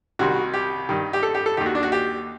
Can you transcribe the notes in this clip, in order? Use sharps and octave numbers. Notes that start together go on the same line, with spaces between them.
C2 C3 D#3 F#4
G4
G2 D#3
G4
A4
G4
A4
D#2 D#3 G4
F#4
D4
F#4
G4